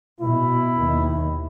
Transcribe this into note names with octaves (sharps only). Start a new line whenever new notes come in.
B2 E4
D#2 D#3